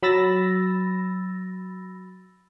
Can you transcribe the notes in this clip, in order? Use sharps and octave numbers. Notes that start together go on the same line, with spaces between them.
F#3 B5 E6 A6 A#6